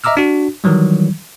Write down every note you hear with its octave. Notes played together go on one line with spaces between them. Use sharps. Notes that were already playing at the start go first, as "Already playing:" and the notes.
D#5 E5 A#5 D6 E6 F6
D4 F#4
D#3 E3 F#3 G3